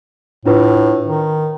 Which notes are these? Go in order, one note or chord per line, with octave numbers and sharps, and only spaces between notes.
A2 D4 F4 B4
D#3